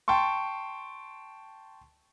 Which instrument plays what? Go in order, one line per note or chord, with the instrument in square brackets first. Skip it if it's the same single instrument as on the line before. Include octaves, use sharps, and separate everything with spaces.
[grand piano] G5 A5 C6 C#6